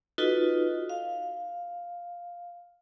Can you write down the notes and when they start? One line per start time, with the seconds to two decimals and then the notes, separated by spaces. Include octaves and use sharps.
0.18 D#4 F4 F#4 A4 B4 D#5
0.90 F5